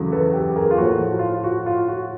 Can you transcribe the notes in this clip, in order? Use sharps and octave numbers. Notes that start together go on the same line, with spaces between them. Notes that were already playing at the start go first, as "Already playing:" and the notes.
Already playing: E2 C#3 F#3 A3
A4 B4
G4 A4
G#4 A#4
F4
A2 F3 A3 F#4
F#4
F4
F4
F#4
F4
F#4